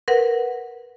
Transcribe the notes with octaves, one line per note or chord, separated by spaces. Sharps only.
A#4 B4 F#5